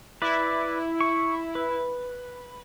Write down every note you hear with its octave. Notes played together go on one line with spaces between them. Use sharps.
E4 B4 D5
C#6
B4